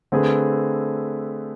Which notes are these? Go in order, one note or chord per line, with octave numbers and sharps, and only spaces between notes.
D3 A3 C4 G#4 B4